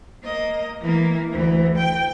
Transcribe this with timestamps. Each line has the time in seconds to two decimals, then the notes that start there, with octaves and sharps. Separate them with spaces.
0.24 A#3 D#5
0.81 E3 A#3
1.31 D2 E3
1.77 G5